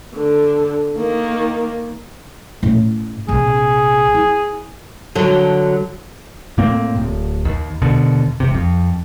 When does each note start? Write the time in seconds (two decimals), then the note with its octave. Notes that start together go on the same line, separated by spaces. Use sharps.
0.14 D3
0.97 D#3 A#3
2.63 A2 C#4
3.28 A#1 C3 G#4
4.14 E4
5.15 D3 F#3
6.58 A2 A#3 C4
6.97 D1
7.45 D#2
7.82 D#2 B2 D3
8.40 E1 C3
8.54 F2